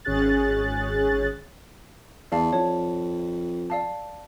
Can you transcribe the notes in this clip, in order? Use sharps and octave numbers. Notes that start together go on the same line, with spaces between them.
G#1 C#4 G#4 F#6 A6
E2 D5 F5 A5
F2 C#5 A5
D5 F5 A5